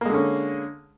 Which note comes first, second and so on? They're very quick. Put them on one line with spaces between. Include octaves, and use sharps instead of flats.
A#3 G#3 D3 C#4